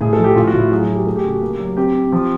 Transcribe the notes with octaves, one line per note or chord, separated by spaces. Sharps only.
A2 G#4
A4
F3
G4
A2 F4
F#4
A2
E4
F#3 G#4
G#4
A3
G4
A3 G#4
G4
C#3 F#4
G4
A#3
F#3
C4 G4
C4
F3